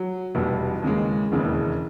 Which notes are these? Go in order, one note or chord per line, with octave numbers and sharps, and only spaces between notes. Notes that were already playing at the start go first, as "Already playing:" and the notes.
Already playing: F#3
F1 E2 B2 G3
D#2 C#3 E3 G#3
E1 D#2 C#3 E3